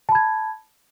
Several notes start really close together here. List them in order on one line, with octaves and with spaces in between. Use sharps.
A5 B5 G#6